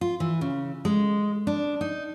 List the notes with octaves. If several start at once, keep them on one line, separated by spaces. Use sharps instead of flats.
F4
E3
C#3
G#3
D4
D#4